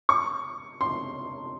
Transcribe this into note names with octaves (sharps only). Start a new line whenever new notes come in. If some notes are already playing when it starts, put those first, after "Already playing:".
C#6
C6